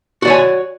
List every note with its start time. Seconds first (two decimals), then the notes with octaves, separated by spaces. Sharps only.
0.22 F#4
0.25 D5
0.27 C#5
0.30 G#5